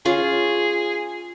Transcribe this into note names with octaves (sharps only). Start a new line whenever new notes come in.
C#4 F4 G#4